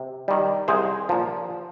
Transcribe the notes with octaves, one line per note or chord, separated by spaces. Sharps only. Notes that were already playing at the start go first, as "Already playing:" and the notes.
Already playing: C3
D#3 G3
C2 G#4 C5
A#2 F3